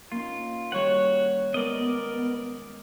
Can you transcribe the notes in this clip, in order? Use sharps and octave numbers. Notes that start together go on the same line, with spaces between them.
A#3 C#4 D#4 F4
D#3 G3 F#4 C#5 F#5
G#3 B3 A#4 D5 D#5